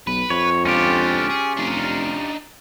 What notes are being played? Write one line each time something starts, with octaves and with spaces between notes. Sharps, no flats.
B1 B4
F2 C#5
C#2 D3 C#4 F4 G4
G#4
F1 D4 D#4